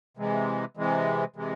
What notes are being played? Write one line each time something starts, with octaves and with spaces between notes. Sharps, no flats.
C3 E3 G#3
C3 E3 G#3
C3 E3 G#3